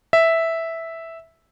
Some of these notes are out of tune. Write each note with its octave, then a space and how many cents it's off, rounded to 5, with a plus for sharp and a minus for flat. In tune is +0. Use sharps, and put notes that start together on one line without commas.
E5 -5